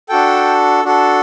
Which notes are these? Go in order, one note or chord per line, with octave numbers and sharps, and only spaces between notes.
D4 F#4 A4 G5
D4 F#4 A4